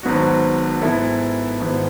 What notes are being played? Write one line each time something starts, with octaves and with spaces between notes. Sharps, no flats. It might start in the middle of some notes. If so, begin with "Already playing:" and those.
G#1 G#2 F#3 B3 F#4
G#2 E3 B3 E4 A4
G#1 G#2 E3 B3